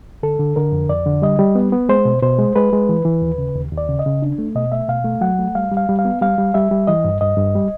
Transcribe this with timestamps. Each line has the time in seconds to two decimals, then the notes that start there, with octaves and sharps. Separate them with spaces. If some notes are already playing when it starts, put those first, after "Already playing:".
0.23 D3 A4
0.39 D3
0.56 D3 A#4
0.72 F2
0.89 F2 D5
1.06 D3
1.22 G3 D#5
1.39 G3
1.55 B3
1.72 B3
1.89 G#3 C5
2.05 B2
2.22 B2 C5
2.39 G#3
2.56 G#3 B4
2.73 G#3
2.89 E3
3.05 E3
3.22 D#2
3.38 C#3
3.56 D#2
3.71 D#2
3.78 D5
3.89 C#3
3.99 D#5
4.06 C#3
4.22 D4
4.38 A3
4.55 B2 D#5
4.72 A3 E5
4.89 B2 F5
5.04 A3
5.21 F#3 F#5
5.39 A3
5.55 G3 F5
5.71 G3
5.77 F5
5.89 G3
5.99 F5
6.05 B3
6.22 G3 F5
6.38 G3
6.54 G3 E5
6.71 G3
6.87 E3 D#5
7.04 G2
7.21 G2 D#5
7.37 G2
7.55 G3